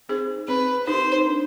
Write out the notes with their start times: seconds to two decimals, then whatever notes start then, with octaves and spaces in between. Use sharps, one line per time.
0.09 C4 D#4 G#4 C5
0.48 C4 B4
0.86 D#4 G4 A#4 C5
1.26 D4